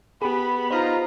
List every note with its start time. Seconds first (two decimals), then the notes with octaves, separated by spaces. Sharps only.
0.22 B3 G4 G#4 B5
0.71 D#4 F4 C5 D#5 F5 A#5 B5